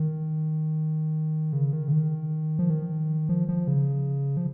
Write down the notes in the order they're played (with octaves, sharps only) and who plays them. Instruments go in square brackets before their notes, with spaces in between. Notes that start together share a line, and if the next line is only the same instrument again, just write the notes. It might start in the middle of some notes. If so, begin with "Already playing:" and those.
Already playing: [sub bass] D#3
C#3
D#3
C#3
D#3
F3
D#3
F3
F3
C#3
F3